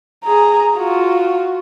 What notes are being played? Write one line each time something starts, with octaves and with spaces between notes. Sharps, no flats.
G#4 A#5
F4 F#4